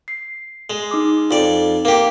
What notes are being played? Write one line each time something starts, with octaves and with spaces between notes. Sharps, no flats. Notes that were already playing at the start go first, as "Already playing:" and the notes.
C7
G#3
D#4 D6
F2 D5
A#3 G4